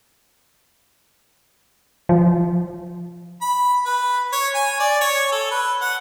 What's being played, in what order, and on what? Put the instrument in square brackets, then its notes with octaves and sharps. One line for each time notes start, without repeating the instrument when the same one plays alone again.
[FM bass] F3
[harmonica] B5
B4
C#5
G#5
D5
C#5
A4
B4
F#5